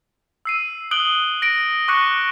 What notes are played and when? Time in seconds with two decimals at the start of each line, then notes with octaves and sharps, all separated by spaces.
0.45 E6 C7 D#7
0.91 D#6 F#6 D7 F#7 G7
1.42 A#6 D7
1.88 C#6 D6 F#6 A#6 C#7 G7